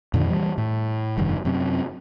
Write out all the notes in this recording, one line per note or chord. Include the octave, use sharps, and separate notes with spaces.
F2 A#2 D3 D#3
E3 G3
A2
F1 G2 D#3
F#2 C3